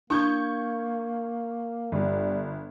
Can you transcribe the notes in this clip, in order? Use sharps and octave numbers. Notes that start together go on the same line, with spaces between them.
A#3 D4 E4 C#6 G6 G#6
G1 G3